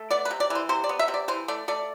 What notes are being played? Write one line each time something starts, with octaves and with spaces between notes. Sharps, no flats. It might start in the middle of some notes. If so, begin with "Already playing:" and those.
Already playing: A3
B3 D5
B4
C3
D5
E3 C5
C3 C5
D5
B3
E5
C3
D5
E3 C5
A3 D5
A3 D5